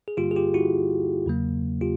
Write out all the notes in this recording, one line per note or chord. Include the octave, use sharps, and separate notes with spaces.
G#4
G2 D3 G3 A#3 F4 G4
G#4
F4 G4
E4 F#4
E2 C#3 F#3 A#3
F4 G4